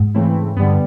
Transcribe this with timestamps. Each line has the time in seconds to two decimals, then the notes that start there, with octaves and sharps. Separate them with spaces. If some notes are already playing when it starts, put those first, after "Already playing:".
Already playing: G#2
0.14 C#3 E3 A3 C4 E4
0.56 G2 D3 G3 B3